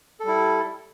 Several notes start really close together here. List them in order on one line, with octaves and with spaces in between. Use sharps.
A4 G3 E4